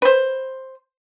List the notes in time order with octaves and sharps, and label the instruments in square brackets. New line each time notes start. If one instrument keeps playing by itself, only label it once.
[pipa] B4 C5